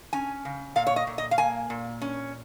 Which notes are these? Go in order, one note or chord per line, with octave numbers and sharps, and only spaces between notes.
C#4 G#5
C#3
A#2 F5
C#5
D#5
A#2
D#5
F5
A#3 G#5
A#2
C#4